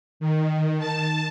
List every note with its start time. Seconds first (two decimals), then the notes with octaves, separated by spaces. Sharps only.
0.20 D#3
0.79 A5